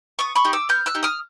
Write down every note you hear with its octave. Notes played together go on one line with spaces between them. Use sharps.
B3 C#6 D#6
B5 C#6
D#4 G4
D6 E6
B3 F6 G6
E6 F#6
D#4 G4
D#6 F6